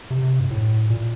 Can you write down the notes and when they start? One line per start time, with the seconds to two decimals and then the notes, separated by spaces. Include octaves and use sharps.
0.11 C3
0.40 G2
0.51 A2
0.90 A#2